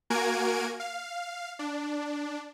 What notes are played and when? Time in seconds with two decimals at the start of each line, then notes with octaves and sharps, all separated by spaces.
0.10 A#3 F#4 A#4 G#5 G#6 D7
0.80 F5
1.59 D4